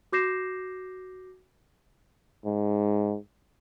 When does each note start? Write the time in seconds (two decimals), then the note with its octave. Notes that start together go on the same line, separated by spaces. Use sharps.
0.13 F#4 D6 G6 A#6 C7 E7
2.45 G#2